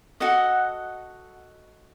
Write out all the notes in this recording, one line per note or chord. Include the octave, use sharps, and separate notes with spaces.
F#4 A4 D#5 F#5